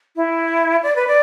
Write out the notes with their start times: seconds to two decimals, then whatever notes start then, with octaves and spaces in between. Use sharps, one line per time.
0.16 E4
0.83 D5
0.96 B4
1.08 D5